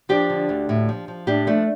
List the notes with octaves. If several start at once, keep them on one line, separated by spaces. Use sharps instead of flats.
F3 D4 G4
D3
D2
A2
F3
F3
A2 D4 G4
F3 A3 D4